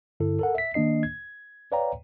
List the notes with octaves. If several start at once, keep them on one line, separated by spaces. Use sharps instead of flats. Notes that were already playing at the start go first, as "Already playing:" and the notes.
G2 D3 E4 A4
A4 A#4 F#5
E5 B6
D#3 A#3 D4 D#5 C7
G#6
B4 C#5 D5 F5 G5 A#5